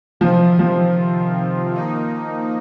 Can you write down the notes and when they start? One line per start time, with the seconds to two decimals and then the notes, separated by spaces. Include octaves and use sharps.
0.20 C3 D#3 F3 C4 F4
0.59 F3
1.74 D#3 A#3 D#4